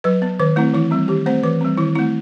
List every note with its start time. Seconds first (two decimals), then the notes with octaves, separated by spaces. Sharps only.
0.04 F#3 B4
0.22 B3
0.40 D#3 B4
0.56 A3 C4 E4
0.73 E3 E4
0.91 G3 C4
1.08 D#3 G4
1.26 A3 C4 C5
1.43 E3 B4
1.61 G3 C4
1.78 D#3 E4
1.95 C4 E4
1.99 A3